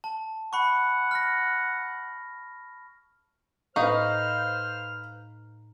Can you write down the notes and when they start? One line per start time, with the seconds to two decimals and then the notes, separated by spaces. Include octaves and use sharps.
0.04 A5
0.53 F#5 B5 C#6
1.11 F6 A#6
3.76 A2 D#4 B4 C5 F5 F6